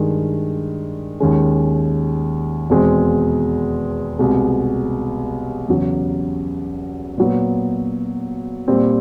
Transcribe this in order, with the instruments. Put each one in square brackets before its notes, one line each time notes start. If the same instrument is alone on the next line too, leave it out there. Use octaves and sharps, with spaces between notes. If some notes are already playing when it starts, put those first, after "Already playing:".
Already playing: [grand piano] G2 D#3 G#3
D#2 D#3 G#3 C#4
E2 B2 G#3 C4
C2 B2 G#3
E2 C#3 F#3
A#2 F#3 B3
A#2 G3 C4